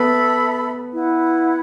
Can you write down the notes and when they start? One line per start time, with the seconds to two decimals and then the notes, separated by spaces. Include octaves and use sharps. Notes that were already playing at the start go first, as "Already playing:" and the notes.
Already playing: B3 A4 E5 B5
0.93 E4 B4 F#5